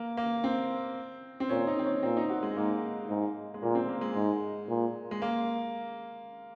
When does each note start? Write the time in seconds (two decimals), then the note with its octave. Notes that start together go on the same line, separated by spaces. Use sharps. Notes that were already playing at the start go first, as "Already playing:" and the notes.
Already playing: A#3
0.17 A#3
0.44 C4
1.40 C4
1.49 A#2 C#4
1.67 D#4
1.79 C4
1.85 C#4
2.03 A#2 C4
2.17 D#4
2.29 F#4
2.43 G#3
2.56 G#2 A#3
3.09 G#2
3.54 G#3
3.62 A#2 A#3
3.75 C4
3.89 A#3
4.01 G#3
4.15 G#2
4.69 A#2
5.11 G#3
5.22 A#3